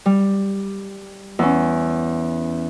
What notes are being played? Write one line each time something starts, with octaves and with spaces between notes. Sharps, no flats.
G3
E2 C#4